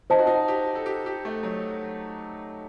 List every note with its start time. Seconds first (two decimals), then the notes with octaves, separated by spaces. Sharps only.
0.10 D#4 C5 D#5 A5
0.19 F#4
0.27 D#4
0.48 G4
0.75 A4
0.86 G4
1.06 G4
1.25 A3
1.43 F#3